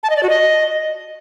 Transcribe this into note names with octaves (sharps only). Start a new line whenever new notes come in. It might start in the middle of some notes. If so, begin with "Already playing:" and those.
A5
D#5
D5
F#4
D#5